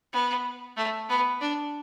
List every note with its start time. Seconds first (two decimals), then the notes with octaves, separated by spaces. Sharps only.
0.13 B3
0.77 A3
1.09 B3
1.41 D4